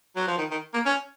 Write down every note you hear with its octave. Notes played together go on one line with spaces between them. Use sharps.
F#3
F3
D#3
D#3
A#3
C#4